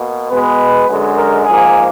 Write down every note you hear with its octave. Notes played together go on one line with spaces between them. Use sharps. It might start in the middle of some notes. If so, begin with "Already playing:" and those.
Already playing: B2 A#3
B2 G#3 B3 B4
F#2 D3 G#3
A#4
G#2 F3 A#3 G#4